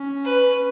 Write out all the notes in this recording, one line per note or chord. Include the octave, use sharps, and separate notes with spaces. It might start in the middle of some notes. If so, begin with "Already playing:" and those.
Already playing: C#4
B4